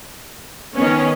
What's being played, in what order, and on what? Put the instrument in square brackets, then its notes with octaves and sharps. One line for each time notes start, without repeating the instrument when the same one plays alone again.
[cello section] D#3 B3 [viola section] C#4